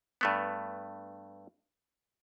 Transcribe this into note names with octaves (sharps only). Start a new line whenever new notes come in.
G2 A3 B3